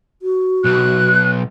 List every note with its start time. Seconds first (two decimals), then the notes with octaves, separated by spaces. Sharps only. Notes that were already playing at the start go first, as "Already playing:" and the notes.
0.22 F#4
0.64 B1 F#6